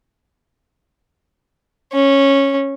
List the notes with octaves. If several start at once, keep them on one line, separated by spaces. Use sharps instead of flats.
C#4